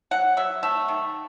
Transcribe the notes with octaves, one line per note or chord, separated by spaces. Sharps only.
F#3 F#5
F#3 E5
A3 E5
D#3